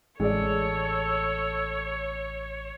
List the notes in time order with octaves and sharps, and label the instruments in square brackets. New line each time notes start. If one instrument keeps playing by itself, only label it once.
[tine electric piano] A1 [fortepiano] G#3 D5 [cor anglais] A4 [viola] C#5